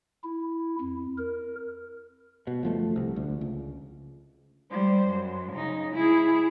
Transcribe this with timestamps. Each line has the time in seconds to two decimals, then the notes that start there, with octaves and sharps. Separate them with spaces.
0.23 E4
0.81 F2
1.18 A#4
2.47 B2
2.63 F#1 F3 A3
2.96 C2
3.16 D2
3.41 C#2
4.70 G3 C5
5.08 F#2
5.52 C#3 D#4
5.95 E4 G#4